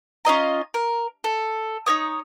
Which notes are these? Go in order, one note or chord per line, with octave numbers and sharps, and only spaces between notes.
C#4 F4 D#5 A#5
A#4
A4
D#4 A#4 C#5 D#6